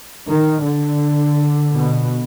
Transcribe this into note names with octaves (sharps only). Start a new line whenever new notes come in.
D#3
D3
B2